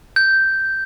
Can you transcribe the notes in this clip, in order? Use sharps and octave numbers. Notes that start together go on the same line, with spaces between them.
G6